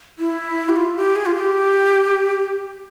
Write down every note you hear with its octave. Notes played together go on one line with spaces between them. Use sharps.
E4
G4
F4
G4
G#4
F4
G4